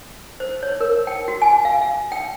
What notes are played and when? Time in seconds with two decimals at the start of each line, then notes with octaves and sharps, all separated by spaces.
0.40 C5
0.63 C#5
0.81 A#4
1.07 G5
1.28 F#4
1.42 G#5
1.65 F5
1.82 F5
2.12 G5